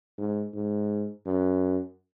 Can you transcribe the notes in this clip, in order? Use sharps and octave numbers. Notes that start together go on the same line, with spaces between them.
G#2
G#2
F#2